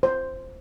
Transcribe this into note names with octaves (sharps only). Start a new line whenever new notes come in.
C5